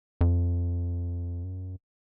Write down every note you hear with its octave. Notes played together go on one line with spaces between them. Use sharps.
F2
F#2